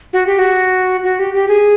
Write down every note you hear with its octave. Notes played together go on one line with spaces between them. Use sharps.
F#4
G4
F#4
F#4
G4
G4
G#4